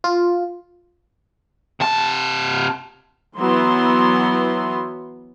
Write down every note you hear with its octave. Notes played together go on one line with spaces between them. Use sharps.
F4
C3 A5
E3 F#3 B3 E4 C6